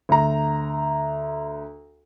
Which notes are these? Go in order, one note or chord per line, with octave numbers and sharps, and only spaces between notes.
D2 A#5